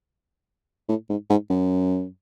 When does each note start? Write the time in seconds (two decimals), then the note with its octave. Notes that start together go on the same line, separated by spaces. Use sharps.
0.89 A2
1.09 G#2
1.30 G#2
1.50 F#2